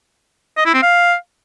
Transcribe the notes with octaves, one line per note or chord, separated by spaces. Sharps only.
D#5
E4
C4
F5